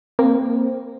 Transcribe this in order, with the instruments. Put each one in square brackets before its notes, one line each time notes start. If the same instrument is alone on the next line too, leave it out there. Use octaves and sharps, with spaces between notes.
[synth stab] A#3 [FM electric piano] C4